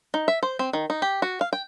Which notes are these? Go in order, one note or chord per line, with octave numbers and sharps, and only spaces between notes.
D#4
E5
C5
C4
D#3
D#4
G4
F#4
F5
G5